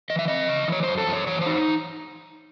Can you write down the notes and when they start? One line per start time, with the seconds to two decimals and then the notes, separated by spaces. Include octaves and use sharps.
0.10 E3 D#5
0.19 E5
0.28 C4 D#5
0.49 C#3
0.68 E3 C#5
0.83 F#2 C5
0.98 A4
1.07 F#2
1.13 C#5
1.27 E3 C#5
1.41 D#4 C5